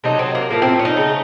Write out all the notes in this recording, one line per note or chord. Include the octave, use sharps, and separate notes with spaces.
C3 F#3 A3 D#4
C4
A#3
A2 F3 A3 A#3
C4
C#4
D#4
C#3 A3